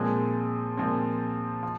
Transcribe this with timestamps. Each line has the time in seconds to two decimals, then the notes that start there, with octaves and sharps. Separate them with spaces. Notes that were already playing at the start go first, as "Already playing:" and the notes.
Already playing: A#2 F3 G#3 C4
0.77 A#2 F3 G#3 C4
1.63 F3